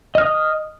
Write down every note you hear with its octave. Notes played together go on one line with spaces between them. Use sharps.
D#5 D#6 F6